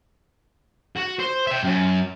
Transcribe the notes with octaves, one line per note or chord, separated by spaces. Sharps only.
F#4
C5
E5 G5
F#2